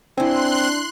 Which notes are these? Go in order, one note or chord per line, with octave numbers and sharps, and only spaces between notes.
C4 D4 E4 G#5 C6 F#6